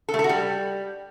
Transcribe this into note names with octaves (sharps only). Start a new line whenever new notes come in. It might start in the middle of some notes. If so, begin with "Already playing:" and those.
A4
A3
A4
F#4
G3